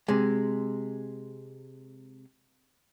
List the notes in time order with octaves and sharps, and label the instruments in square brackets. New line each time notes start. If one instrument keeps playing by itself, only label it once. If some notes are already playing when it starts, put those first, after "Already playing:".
[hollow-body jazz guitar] C3 G#3